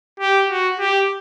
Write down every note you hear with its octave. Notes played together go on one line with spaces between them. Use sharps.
G4
F#4
G4